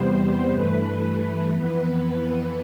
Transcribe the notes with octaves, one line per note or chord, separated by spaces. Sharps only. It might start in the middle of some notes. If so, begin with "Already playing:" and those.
Already playing: E2 C3 G3 B3 C5
G2 E3 A3 B4
B4
F2 E3 B3